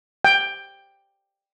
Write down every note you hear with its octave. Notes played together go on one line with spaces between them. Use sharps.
G5